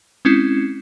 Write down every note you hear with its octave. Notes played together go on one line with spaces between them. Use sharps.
G#3 C4 C#4 E4